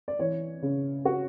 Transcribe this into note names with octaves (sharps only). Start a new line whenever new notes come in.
D5
E3 C#5
C#3
F#4